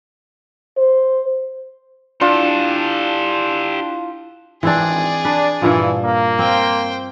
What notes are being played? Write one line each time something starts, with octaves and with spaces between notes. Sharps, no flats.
C5
D4 E4 F4 G4 A4 F5
G#1 E3 C4 D4 G#4 D5
D4 B4
G2 A#2 E3 F3
A#3
C4 C5 G5